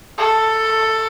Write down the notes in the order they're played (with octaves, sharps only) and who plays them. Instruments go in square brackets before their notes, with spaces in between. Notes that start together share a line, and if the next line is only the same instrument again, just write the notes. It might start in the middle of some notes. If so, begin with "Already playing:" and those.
[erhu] A4